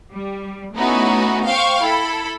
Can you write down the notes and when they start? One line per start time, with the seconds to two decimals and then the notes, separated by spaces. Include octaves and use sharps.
0.12 G3
0.75 A3 B3 C#4 D#4 E4 F#4
1.46 C5 F5 G5 C#6
1.80 E4 A4 B5